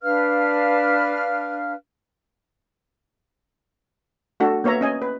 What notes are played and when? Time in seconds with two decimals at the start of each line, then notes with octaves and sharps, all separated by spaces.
0.01 D4 B4 F5 F6
4.40 A3 D4 F#4 A4
4.64 A#3 B3 C#5 E5 A#5
4.81 C#4 D#5 G#5
5.02 B4